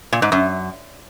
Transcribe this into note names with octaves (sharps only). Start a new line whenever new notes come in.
A#2
G#2
F#2